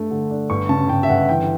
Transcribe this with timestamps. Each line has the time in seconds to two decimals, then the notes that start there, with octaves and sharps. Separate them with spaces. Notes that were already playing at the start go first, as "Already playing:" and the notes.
Already playing: G2 A3
0.10 D3
0.30 D4
0.50 G1 C#6
0.69 C#3 A5
0.89 G1 G5
1.03 E5
1.09 G1 F#5
1.29 E3 G5